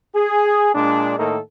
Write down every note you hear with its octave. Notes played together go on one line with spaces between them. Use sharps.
G#4
A#2 G#3 D4
A2 D#3 A#3 D#4 A4